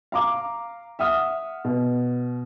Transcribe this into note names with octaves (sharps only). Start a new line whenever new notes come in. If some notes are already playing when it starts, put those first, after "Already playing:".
F5 A#5 D6
E5 F#5 D#6 F6
B2